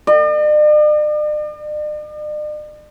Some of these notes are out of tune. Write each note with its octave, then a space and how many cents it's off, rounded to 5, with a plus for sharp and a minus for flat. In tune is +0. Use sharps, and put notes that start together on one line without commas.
D5 +45